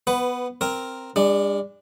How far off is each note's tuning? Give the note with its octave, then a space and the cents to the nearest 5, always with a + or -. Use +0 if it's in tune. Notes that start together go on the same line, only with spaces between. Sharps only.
B3 +0 B4 +20
C4 +0 A#4 +0
G#3 -45 D4 +0